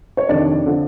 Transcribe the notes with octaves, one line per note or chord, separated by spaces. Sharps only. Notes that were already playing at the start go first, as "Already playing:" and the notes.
C#5
F2 C3 D#3 D4 D5
D3 F3